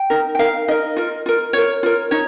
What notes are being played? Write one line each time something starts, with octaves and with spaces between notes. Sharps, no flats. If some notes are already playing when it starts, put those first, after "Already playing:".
Already playing: G5
D#4 A#4
G5
D#4 A#4 F5
D#4 A#4 D#5
F4 A#4
F4 A#4
F4 A#4 C#5
F4 A#4
D#4 C#5